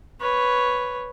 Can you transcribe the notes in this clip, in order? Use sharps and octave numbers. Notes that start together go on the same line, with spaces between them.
B4 C#5